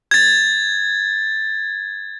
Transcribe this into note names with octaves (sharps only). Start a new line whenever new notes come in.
G#6 A6